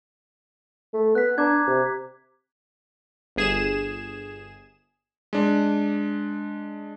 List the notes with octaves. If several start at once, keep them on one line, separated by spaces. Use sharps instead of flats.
A3
B3 F#6 B6
D4 A#5 D6 G#6
C3
G1 G#4 E7
G#3 D4